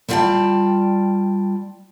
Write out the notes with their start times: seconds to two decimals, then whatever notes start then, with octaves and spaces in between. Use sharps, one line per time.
0.08 G3 F4 D5 F5 G5 A5